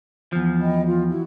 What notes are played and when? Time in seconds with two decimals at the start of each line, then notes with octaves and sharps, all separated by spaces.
0.33 E2 F3
0.61 D#5 G5 B5
0.84 F4
1.10 E4 F#4